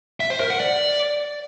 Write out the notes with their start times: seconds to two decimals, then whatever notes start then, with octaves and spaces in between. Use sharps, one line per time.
0.20 E5
0.30 C5
0.40 A#4
0.50 F#5
0.60 D5